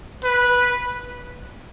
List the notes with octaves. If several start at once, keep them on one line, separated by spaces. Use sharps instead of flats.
B4